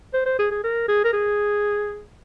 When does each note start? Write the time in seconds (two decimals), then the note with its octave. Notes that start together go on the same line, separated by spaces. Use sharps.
0.14 C5
0.26 C5
0.39 G#4
0.51 G#4
0.64 A#4
0.88 G#4
1.04 A#4
1.13 G#4